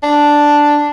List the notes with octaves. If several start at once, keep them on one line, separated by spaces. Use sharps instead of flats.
D4